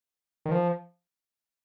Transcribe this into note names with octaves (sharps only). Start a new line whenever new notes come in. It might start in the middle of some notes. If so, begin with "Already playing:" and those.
D#3
F3